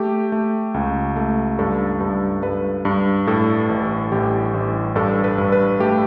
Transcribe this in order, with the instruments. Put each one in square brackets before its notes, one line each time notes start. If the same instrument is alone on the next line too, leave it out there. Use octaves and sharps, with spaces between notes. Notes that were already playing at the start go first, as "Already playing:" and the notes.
Already playing: [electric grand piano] A3 G4
A3
C#2
A3
G2 A4
G2
G2 B4
G2
A2 A4
A1
A1 G4
A1
G2 A4
B4
G2
B4
A3 G4